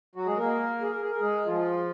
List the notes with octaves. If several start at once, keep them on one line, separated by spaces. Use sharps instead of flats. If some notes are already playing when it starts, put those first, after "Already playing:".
F#3 F#4
G#3 G#4
A#3 A#4
G#4
A#4
G#4
A#4
G#3 G#4
F3 F4